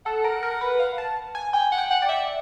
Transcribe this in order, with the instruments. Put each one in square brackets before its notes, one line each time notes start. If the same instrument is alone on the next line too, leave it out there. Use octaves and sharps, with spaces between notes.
[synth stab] A4 [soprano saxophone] F#5
[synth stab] A#4
A#4
B4
F5
A5
G#5
[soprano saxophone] G5 [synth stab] G#5
[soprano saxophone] F#5
[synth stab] G5
[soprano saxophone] F#5
[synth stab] D5
[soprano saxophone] E5